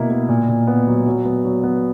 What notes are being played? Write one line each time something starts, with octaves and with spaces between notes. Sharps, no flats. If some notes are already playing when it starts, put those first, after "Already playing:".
Already playing: B2 A#3 E4
A#3
A#2
A#2
B3
F#3
F#3
B3
F#3
B3